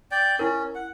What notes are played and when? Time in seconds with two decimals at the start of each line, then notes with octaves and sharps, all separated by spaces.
0.11 D5 G5
0.39 C#4 E4 A#4
0.75 F#5